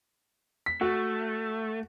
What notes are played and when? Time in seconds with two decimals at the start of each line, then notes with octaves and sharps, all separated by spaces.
0.66 B6
0.81 A3 F#4